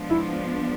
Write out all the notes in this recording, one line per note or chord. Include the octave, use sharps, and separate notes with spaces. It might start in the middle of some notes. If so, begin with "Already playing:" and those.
Already playing: F3 G#3 B3 D4
E4